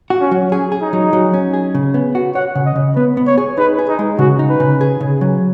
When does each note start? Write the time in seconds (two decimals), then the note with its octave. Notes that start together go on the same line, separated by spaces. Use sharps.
0.10 F#4
0.21 C#4
0.31 F#3
0.52 C#4 G#4
0.72 G#4
0.82 D#4
0.93 F#3
1.13 F#3
1.34 C#4
1.53 G#4
1.75 C#3
1.94 B3
2.15 F#4
2.35 C#5 F#5
2.55 C#3
2.66 D#5
2.76 C#3
2.96 B3 B4
3.17 B3
3.27 C#5
3.38 G#4
3.58 D#4 B4
3.79 G#4
3.89 D#4
3.99 G#3
4.19 C#3 F#4
4.39 D#4
4.50 B4
4.60 C#3
4.81 G#4
5.01 C#3
5.21 F#3